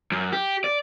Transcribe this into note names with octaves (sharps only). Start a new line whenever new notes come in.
F#2
G4
D5